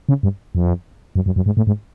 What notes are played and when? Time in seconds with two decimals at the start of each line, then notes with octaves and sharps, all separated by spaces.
0.09 C#3
0.23 G2
0.55 F2
1.16 F#2
1.26 F#2
1.36 F#2
1.46 G#2
1.57 A2
1.67 G#2